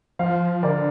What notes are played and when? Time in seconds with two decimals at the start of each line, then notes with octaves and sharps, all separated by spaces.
0.19 F3 C5 F5
0.63 D3 A#4 D5